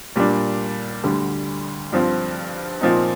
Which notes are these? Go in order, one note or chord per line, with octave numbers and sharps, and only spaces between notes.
A#2 G3 D4
D2 D3 G3
G2 F3 C4
A#2 F3 C4 D#4